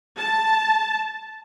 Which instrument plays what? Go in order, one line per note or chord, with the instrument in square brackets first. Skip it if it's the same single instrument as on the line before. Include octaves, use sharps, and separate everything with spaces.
[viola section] A5